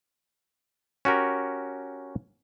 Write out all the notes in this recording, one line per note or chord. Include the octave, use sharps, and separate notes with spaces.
C#4 F#4 G4 A#4